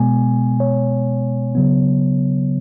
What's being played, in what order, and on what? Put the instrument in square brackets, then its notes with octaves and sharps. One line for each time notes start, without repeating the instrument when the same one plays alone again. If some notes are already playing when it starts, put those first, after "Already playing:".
Already playing: [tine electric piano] B2 G#3 B3 G#5
C#5
C#3 F#3 B3